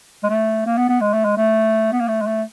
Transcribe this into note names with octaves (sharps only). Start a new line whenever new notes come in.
G#3
A3
A#3
B3
B3
G#3
A3
G#3
A3
B3
A#3
A3
G#3
A3